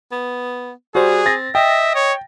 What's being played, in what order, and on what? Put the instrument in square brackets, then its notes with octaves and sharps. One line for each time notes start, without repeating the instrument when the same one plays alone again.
[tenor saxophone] B3
[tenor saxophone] G3 [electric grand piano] F#4 C5 [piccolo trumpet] G#4
[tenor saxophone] C4 [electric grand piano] A6 A#6
[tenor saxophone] D#5 [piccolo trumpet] E5 [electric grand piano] G5
[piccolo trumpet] C#5